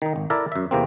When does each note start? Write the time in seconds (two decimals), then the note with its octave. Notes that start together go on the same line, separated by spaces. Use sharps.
0.02 D#3 D#4
0.16 G#1
0.30 E4 A4 A#4 D5 E5 A5
0.52 F#2 E5
0.71 E2 C3 A#3 C4